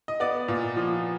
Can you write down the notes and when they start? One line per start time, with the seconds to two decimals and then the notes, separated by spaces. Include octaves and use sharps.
0.08 D#5
0.20 B3 D5
0.48 A#2
0.76 F3